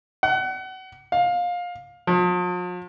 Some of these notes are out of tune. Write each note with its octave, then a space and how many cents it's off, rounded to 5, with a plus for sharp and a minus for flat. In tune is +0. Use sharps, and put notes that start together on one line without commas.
F#5 +30
F5 +20
F3 +45